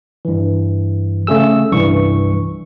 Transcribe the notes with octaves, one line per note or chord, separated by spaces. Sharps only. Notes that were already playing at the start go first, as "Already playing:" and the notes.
G2 E3
C#3 A3 G#4 E6
C2 G2 E3 C#6